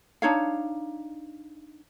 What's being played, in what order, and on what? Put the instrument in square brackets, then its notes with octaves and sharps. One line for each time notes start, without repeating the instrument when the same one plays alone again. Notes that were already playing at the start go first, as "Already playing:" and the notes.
[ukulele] D4 D#4 C#5 F5